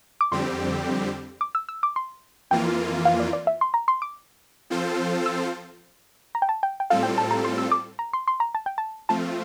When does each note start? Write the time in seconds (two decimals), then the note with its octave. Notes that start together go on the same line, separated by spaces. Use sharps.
0.21 D6
0.31 F2 D3 G3 C4 G4 C6
1.41 D6
1.55 E6
1.69 E6
1.83 D6
1.96 C6
2.51 F2 E3 A#3 F4 G5
3.05 F5
3.20 D5
3.33 D5
3.47 E5
3.61 C6
3.74 A#5
3.88 C6
4.02 D6
4.70 F3 C4 F4 A4 C5
5.26 E6
6.35 A#5
6.42 G5
6.49 A5
6.63 G5
6.80 G5
6.90 A2 G3 C4 F4 A4 F5
7.03 G5
7.18 A5
7.31 A#5
7.44 C6
7.58 E6
7.72 D6
7.99 A#5
8.13 C6
8.28 C6
8.40 A#5
8.55 A5
8.66 G5
8.78 A5
9.09 F3 A3 C4 F4 A5